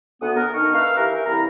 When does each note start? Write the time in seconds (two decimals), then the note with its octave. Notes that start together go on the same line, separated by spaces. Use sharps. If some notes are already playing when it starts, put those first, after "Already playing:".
0.21 D2 B3 F#5 D#6
0.36 A#4
0.54 D#3 D4 D#4 C#6 F6
0.74 A#4 B4 E5 F5
0.97 E3 G4 A#4
1.26 C2 E4 A#5